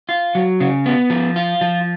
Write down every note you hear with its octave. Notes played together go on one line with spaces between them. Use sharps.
F4
F#3
C#3
B3
F3
F4
F3